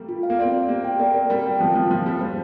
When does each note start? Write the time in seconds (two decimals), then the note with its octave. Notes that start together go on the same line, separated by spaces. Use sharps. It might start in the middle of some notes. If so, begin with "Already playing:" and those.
Already playing: G3 A3 A#3
0.09 F4
0.23 F5
0.30 A#3
0.39 C4 D5
0.54 A#4
0.69 A#3 G4
0.84 G5
0.99 A#3 D5
1.14 A#4
1.30 G3 G4
1.46 G5
1.60 F3 C5
1.75 F3 F4
1.91 F3 A#3
2.06 G3 A#3
2.21 G3 C5